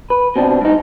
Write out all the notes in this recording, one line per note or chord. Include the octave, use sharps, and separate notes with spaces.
B4
B2 C4 D4
G2 D#4